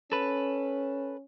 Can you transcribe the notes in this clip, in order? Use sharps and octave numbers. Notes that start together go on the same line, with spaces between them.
C#4 A4 B4